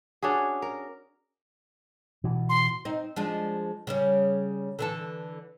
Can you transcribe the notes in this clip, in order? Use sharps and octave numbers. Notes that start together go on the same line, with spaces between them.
C#4 D4 F#4 G#4
A#4
B2 E3
C6
C4 D#4
F3 G#3 D4
C#3 G3 C#4
D3 E3 A4